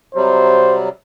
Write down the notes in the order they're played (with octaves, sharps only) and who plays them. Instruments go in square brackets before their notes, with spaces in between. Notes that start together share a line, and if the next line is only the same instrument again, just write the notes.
[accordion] C3 F#3 G3 [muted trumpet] C5